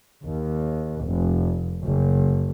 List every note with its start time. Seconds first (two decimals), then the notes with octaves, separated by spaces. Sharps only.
0.23 D#2
1.04 F1
1.83 F#1